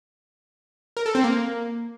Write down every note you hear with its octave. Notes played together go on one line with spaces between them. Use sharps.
A#4
A4
C4
A#3